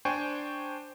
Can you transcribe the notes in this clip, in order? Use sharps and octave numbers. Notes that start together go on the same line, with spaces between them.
D4 C5 G5 G#5 C#6